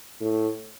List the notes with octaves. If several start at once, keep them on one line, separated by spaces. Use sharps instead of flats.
A2